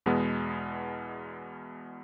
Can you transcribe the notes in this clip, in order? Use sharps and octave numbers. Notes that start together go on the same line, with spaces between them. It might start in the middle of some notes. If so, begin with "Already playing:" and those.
E2 B2 G#3 B3